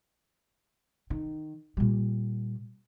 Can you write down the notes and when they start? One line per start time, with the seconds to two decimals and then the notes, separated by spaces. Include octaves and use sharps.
1.10 D#3
1.77 A#2 G3